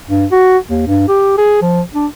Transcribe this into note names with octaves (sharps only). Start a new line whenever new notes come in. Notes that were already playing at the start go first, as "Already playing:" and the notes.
G2
F#4
D#2
G2
G4
G#4
F3
D4